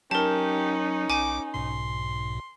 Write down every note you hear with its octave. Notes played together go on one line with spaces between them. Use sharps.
F#3 C#4 D#4 G4 A#4 A5
B1 G#5 D6
B1 G#2 B2 C6